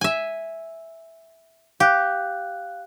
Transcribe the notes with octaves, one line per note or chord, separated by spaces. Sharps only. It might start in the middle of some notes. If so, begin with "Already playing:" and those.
E5 G#5
G4 F5 F#6